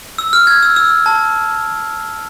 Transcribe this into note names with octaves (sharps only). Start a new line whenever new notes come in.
E6
F6
G#6
E6
E6
A5